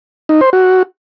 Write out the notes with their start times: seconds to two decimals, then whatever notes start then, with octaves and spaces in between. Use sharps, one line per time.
0.29 D#4
0.41 C5
0.53 F#4